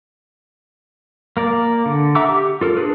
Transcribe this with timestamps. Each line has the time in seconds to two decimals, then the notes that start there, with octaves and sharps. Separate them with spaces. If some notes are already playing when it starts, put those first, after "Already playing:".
1.37 A#3 A#4 D5
1.86 D3
2.15 E5 F#5 A#5 D6 E6
2.29 G4
2.61 F4 A4 A#4
2.77 D4 G#4 B4